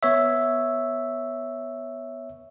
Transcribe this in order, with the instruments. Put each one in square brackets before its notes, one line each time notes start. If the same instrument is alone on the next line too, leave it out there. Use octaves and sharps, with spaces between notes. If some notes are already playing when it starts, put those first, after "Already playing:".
[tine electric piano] B3 C#5 E5